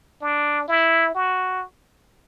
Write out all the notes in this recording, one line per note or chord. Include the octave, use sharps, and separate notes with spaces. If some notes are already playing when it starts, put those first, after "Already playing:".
D4
E4
F#4